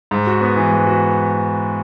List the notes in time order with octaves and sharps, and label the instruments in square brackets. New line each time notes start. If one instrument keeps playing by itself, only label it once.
[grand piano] G#2
F#4
B3
E3
G#2
F#4